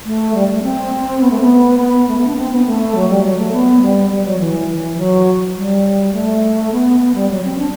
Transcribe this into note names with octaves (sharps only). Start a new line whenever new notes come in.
A3
G3
A3
C4
B3
A3
B3
B3
A3
B3
D4
C4
B3
A3
F#3
G3
F#3
A3
B3
G3
G3
F#3
E3
E3
F#3
G3
A3
B3
B3
G3
F#3
C4
D4